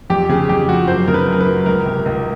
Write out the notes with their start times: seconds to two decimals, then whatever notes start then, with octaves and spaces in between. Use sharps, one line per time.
0.10 F2 G4
0.29 C#3 G#4
0.49 F2 G4
0.68 F3 F#4
0.88 F#2 C5
1.08 C#3 A#4
1.14 B4
1.28 F#2 A#4
1.41 B4
1.47 F#3
1.66 C#2 A#4
1.86 C3
2.06 C#2